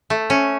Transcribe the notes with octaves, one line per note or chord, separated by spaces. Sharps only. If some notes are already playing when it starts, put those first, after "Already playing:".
A3
C#4